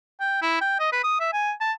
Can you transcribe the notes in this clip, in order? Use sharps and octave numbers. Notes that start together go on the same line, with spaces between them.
G5
E4
G5
D#5
B4
D#6
E5
G#5
A5